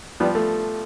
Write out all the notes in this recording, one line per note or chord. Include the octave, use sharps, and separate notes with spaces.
F3 G3 B3
A3